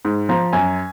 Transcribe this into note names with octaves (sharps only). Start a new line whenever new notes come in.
G#2
F3 A#5
F#2 G#5